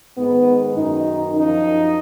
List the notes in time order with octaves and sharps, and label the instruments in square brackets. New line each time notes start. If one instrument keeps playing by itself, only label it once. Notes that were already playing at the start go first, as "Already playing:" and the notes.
[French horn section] G#2 D#3 B3
F#2 D#3 D#4
F#2 F3 D#4